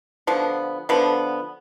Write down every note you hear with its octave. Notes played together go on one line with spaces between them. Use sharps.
D3 F3 B3
D3 F3 B3